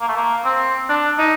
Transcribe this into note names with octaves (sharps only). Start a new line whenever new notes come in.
A#3
A3
A#3
C4
D4
D#4